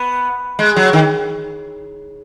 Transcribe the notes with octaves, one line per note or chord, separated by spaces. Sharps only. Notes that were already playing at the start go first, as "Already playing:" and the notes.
Already playing: B3
G#3
F#3
D#3